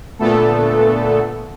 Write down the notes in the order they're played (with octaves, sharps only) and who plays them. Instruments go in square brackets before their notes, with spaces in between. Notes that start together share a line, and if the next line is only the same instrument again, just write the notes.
[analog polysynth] A#2 D3 A3 B3 A4